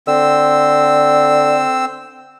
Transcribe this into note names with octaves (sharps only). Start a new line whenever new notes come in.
D3 C4 E6